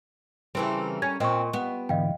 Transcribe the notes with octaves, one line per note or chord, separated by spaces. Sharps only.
C#3 E3 G3 C4 A4 A#4
C#4 G#6
A#2 C4 D#5 C#6
G3 B3
G#2 D3 E3 D#5 F5 G5